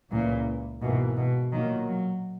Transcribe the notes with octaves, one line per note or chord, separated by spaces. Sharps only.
C#2 A#2 C#3 E3
G#2 B2 E3 A#3
B2
A#2 D#3 F#3 A#3
F#3